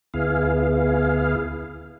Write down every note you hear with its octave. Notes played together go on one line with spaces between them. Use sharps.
D2 B3 E4 G#4 F5